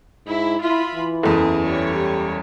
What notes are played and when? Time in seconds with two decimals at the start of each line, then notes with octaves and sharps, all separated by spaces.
0.26 G#2 E4
0.60 E4 F4 E5 B5
0.95 E3
1.23 F#1 E2 G#4 A4
1.64 G3 C#5
1.95 G4